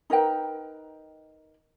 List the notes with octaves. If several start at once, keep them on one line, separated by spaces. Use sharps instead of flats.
D#4 A#4 B4 G5